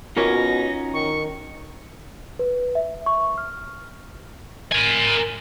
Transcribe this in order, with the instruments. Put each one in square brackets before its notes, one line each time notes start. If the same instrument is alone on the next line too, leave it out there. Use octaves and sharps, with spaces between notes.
[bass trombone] B2 [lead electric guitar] C#4 D#4 [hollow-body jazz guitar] F4 A#4 C#5 [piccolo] A#6
[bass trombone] D#3 [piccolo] C#6
[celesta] B4
E5
C#6
F6
[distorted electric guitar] A#4 G#5